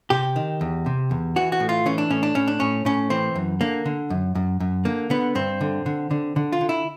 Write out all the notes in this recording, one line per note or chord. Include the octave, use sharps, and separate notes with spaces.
C3 G4
D#3
E2
C3
E2
E3 F#4
F#4
A2
F4
E3 C#4
D4
A2 C#4
D4
A2 C#4
D4
A2 C#4
A2 C#4
E3 C4
F#2
D3 A#3
D3
F#2
F#2
F#2
D3 A#3
D3 B3
G2 C4
D3
D3
D3
D3
F4
D3
E4